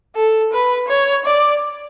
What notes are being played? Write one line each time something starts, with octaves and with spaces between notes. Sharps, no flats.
A4
B4
C#5
D5